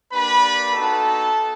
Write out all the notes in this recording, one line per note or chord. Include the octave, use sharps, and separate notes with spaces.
A#3 D4 G4 B4 B5
B3 D#4 F#4 A4 A5